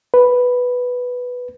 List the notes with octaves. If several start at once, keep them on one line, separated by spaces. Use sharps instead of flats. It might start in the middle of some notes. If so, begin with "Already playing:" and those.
B4